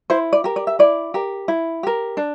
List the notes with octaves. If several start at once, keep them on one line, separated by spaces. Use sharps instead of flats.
E4 C5
D5
G4 A#4
D5
E5
E4 D5
G4 A#4
E4
G4 A#4
D4